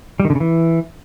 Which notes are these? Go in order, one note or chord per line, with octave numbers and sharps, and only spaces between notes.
G3
D#3
D3
C#3
E3